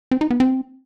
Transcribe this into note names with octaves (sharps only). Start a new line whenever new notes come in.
C4
D#4
B3
C4